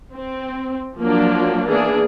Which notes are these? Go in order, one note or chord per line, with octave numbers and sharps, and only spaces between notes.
C4
F3 F#3 A#3 D4
E3 A#3 B3 D4 G#4